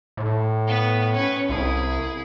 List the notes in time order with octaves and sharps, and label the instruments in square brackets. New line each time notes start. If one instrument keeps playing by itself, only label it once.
[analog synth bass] A2
[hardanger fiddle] B3 B4
C#4 B4
[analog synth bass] C2 [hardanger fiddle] E4 G#4